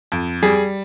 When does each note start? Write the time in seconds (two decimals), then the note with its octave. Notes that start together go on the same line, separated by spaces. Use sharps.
0.12 F2
0.43 G3 G#4